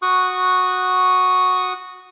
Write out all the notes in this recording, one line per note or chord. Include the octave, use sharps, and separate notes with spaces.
F#4 C#6 D#6 F#6